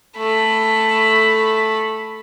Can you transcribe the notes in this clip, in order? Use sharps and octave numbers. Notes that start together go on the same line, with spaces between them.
A3 B5